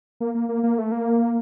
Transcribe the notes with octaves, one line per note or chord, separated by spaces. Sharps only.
A#3
A#3
A#3
A#3
A3
A#3